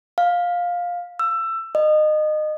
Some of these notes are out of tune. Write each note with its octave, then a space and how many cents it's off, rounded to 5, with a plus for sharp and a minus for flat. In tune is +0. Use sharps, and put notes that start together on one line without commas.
F5 +15
E6 +20
D#5 -25